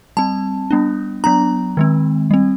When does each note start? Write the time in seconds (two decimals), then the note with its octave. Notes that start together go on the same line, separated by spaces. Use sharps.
0.17 G3 C4 A5
0.71 G3 B3 D4
1.24 F#3 B3 D4 A#5
1.77 D#3 G#3 C4
2.31 G3 C4